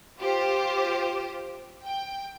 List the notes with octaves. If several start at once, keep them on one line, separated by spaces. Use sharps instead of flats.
F4 G4 C5
G5